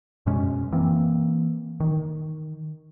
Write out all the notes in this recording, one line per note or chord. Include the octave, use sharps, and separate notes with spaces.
F#2 B2 G#3 C#4
E3 A#3 C4
D#3